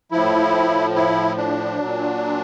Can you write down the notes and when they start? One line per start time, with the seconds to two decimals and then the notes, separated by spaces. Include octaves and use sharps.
0.11 A2 F3 E4
0.95 E4
1.37 D4
1.78 A#2 F#3